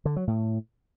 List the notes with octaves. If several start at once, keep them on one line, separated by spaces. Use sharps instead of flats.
D3
F#3
A2